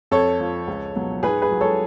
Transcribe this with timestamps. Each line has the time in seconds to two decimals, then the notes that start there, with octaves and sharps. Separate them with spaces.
0.11 F2 A4 C#5
0.40 F3
0.68 C#2
0.96 B2 F#3
1.23 G#2 G#4 B4
1.42 G#4 B4
1.51 F#3
1.61 A4 C#5